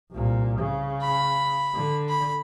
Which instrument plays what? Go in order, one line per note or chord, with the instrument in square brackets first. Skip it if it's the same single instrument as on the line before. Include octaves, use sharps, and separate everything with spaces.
[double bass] C2 A#2
C#3
[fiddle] B5
[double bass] D3
[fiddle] B5